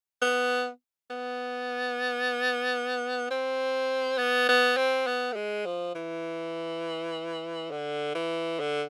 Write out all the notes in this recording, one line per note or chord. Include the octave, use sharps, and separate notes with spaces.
B3
B3
C4
B3
B3
C4
B3
A3
G#3
F3
E3
D3
E3
D3